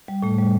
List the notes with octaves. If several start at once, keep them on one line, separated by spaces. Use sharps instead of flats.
G3
A2 A3
G3